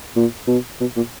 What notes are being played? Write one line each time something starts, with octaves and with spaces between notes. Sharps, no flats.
A#2
B2
B2
A#2